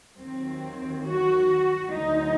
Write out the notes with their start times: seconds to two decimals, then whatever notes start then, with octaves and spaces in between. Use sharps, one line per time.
0.16 D#2 D#3 F#3 C4
1.02 F#4
1.90 D2 D3 F#3 D#4